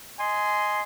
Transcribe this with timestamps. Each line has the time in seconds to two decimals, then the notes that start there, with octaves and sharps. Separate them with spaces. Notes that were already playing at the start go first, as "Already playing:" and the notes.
0.20 D#5 G#5 C6